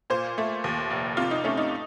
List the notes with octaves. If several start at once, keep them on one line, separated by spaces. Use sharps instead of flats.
A#2 C5
A3
D#2
F1
C3 F4
D#4
A3 C#4
D#4